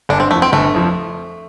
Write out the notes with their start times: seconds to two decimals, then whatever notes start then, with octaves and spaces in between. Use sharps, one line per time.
0.09 G1 D4
0.20 C4
0.31 F2 F3 A3
0.42 C4
0.53 G1 A3
0.74 F2 F3